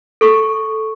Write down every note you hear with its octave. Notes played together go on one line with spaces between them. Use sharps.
A4 C#6